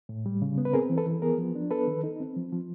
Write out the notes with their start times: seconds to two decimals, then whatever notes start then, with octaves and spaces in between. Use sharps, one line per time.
0.09 A2
0.26 G3
0.42 C#3
0.58 B3
0.65 B4
0.73 C4 G#4 A#4
0.90 E3
0.98 A4 B4
1.06 E3
1.22 B3 G#4 A#4
1.38 F3
1.55 D4
1.71 B3 A4 B4
1.88 D#3
2.03 D#4
2.20 C4
2.36 F3
2.52 F3